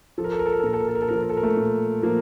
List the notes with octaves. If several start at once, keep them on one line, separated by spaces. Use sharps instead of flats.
F3 A4
A#4
A4
A#4
A4
A#4
A4
A#2 A#4
A4
A#4
A4
A#4
A4
F3 A#4
A4
A#4
A4
A#4
A3 A4
A#2
F3 A#3 A#4